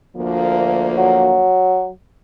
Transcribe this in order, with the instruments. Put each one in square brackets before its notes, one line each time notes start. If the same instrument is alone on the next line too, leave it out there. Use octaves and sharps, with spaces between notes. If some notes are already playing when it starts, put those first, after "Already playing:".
[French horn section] D2 F3 A#3
[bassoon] F#3